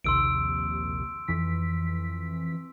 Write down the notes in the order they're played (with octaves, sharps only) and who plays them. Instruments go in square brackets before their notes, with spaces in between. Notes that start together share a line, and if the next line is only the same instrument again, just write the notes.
[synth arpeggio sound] A#1 D#2 C3 [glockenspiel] C6 E6 D7
[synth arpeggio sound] F2 E3 B6